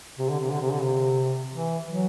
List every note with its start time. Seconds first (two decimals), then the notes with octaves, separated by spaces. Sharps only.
0.18 C3
0.29 D3
0.40 C3
0.50 D3
0.61 C3
0.72 D3
0.83 C3
1.53 E3
1.87 F#3